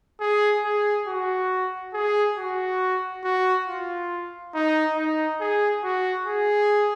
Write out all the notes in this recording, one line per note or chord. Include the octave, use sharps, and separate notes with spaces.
G#4
G#4
F#4
G#4
F#4
F#4
F4
D#4
D#4
G#4
F#4
G#4